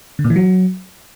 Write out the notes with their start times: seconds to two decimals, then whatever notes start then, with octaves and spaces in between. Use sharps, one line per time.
0.19 D3
0.24 A#2
0.30 E3
0.36 F#3